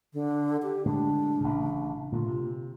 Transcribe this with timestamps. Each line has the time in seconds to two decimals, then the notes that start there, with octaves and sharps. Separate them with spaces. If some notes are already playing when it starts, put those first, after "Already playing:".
0.13 D3
0.63 G4
0.85 A2 D3 G#3 D4
1.40 A1 C#3
2.12 A#2 D3 A3 F4
2.28 C3